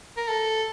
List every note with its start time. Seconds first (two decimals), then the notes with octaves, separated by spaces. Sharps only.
0.17 A#4
0.28 A4